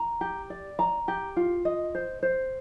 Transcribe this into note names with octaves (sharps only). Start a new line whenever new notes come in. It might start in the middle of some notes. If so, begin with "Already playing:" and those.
Already playing: A#5
G4
D5
A#5
G4
F4
D#5
C5
C5